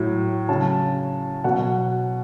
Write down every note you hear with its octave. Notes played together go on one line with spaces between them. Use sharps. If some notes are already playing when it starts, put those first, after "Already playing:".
Already playing: A2 F#3
C#3 F#3 A5
B2 F#3 F#5